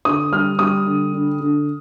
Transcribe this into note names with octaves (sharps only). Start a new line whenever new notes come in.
D3 D#6
G3 F6
G3 D#6
D3
D3
D3